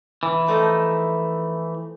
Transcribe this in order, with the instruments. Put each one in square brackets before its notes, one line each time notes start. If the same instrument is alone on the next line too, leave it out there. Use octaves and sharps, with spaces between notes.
[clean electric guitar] E3
[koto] F3 A3 D#4